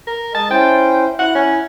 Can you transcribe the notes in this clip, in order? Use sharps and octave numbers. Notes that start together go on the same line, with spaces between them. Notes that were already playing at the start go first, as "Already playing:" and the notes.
A#4
G#3 D#5 A5
C#4 E4 C5 G5
E4 F#5
C#4